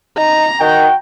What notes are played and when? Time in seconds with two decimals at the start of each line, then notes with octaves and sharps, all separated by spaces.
0.18 D#4 A#5
0.61 D#3 F#4 G5